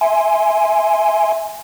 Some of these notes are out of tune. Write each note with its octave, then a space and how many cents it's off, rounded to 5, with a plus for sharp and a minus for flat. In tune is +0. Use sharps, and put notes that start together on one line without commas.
E5 -5 G#5 +0 C6 +0